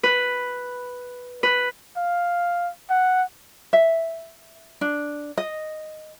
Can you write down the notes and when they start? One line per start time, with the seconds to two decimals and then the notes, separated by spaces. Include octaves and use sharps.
0.03 B4
1.43 B4
1.97 F5
2.90 F#5
3.73 E5
4.81 D4
5.38 D#5